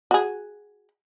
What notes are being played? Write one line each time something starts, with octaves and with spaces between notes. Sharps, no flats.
F#4 G#4